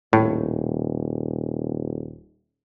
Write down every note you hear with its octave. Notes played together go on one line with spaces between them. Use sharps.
D#1 A2